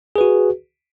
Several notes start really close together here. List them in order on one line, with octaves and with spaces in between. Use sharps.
G#4 B4 F#4